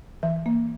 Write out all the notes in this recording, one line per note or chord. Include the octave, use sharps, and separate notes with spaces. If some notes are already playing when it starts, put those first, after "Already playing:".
E3 E5
A#3